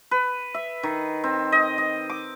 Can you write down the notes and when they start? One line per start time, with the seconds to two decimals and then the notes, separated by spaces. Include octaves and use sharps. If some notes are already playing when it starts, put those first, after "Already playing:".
0.11 B4
0.54 E5
0.83 D#3
1.24 C4
1.52 D#5
1.78 D#5
2.09 D6